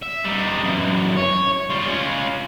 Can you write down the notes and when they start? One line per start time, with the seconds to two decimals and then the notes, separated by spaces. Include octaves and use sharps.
0.03 E5
0.25 G3 D#4
0.64 F#2 E3
1.16 C#5
1.70 G3 F4
1.87 C#4 F4